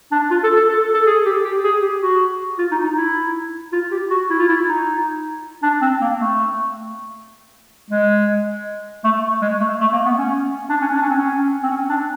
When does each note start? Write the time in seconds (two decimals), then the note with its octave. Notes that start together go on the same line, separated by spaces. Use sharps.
0.12 D4
0.31 F4
0.44 A4
0.56 A4
0.68 A4
0.94 A4
1.07 G#4
1.26 G4
1.45 G4
1.64 G#4
1.82 G4
2.01 F#4
2.59 F4
2.71 D#4
2.84 D#4
2.97 E4
3.73 F4
3.92 G4
4.10 F#4
4.30 E4
4.39 F4
4.48 E4
4.68 D#4
5.63 D4
5.81 C4
6.01 A#3
6.19 A3
7.90 G#3
9.04 A3
9.42 G#3
9.61 A3
9.81 A3
9.93 A#3
10.06 B3
10.18 C#4
10.69 D4
10.82 C#4
10.94 D4
11.02 C#4
11.09 C4
11.16 C#4
11.63 C4
11.70 C#4
11.89 D4